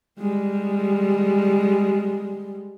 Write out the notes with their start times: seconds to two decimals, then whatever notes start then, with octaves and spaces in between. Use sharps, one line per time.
0.19 G3 G#3